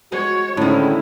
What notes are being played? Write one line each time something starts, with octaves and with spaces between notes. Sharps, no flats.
G#3 F#4 C#5
A2 D3 D#3 G#3 C4 C#4 E4